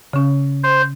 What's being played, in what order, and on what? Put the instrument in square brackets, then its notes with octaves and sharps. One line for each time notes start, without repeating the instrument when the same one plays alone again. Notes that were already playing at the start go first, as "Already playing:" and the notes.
[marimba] C#3 C#4
[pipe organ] C5